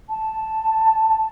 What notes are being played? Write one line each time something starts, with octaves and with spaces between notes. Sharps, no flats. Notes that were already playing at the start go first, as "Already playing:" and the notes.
A5